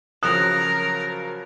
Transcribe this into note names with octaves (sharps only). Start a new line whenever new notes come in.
C#3 F3 F#3 A#4 D#6 F#6